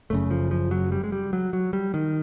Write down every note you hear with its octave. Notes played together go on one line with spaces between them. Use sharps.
F#1 F#2 C#3 A3
F3
F3
F#3
G3
G#3
G3
F#3
F#3
G3
D#3